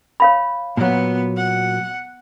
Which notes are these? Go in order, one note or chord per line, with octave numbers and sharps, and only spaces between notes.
C#5 F5 B5
A#2 F#3 B3
F#5